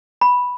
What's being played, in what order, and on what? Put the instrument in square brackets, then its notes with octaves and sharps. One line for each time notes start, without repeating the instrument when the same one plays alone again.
[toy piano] B5